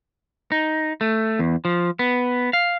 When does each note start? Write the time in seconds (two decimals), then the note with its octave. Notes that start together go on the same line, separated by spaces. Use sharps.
0.52 D#4
1.01 A3
1.39 E2
1.65 F3
1.99 B3
2.53 F5